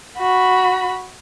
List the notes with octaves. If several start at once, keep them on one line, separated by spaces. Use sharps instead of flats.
F#4 B5